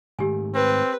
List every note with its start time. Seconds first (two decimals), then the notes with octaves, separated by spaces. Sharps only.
0.19 G#2 D#3 A3 G4 G#5
0.55 C4 B4